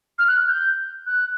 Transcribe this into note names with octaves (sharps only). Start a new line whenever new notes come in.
F6
F#6
G6
F#6